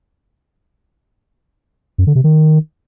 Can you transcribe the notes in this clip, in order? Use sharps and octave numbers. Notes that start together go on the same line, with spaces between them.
F#2
D3
C3
D#3